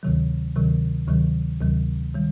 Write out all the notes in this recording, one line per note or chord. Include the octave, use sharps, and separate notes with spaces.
D2 C3 D#3 F#3
D2 C3 D#3 F#3
D2 C3 D#3 F#3
D2 C3 D#3 F#3
D#3 G3